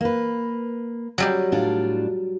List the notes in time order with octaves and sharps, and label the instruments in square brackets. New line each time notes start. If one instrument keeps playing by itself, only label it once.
[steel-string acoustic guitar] A#3 B4
[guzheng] F#3 G3 G4
[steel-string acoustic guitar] A2 D4 F4